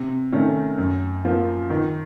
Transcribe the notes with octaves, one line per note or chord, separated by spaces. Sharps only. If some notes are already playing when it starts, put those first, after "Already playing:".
Already playing: C3
D#3 A3 C#4
F#2
F3 A#3 F4
D#3